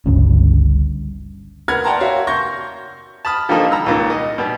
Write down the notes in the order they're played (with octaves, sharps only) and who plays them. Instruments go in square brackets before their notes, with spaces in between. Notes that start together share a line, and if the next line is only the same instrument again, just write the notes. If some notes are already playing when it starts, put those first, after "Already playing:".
[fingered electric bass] G1 C#2 G2 C#4
[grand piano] A#4 B4 F#5 B5 F6 G#6
D5 F#5 G5 A5 A#5 C6
F#4 A#4 C#5 E5 F5
C6 C#6 G6 A#6
[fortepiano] A5 B5 D#6 F6
D3 F3 G3 A#3 D#4 A4
A#5 E6
C#2 A#2 D#3
D#5
B2 G3